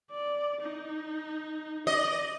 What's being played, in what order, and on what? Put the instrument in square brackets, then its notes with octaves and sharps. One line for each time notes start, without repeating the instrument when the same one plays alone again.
[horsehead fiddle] D5
D#4
[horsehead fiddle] D5 [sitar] D#5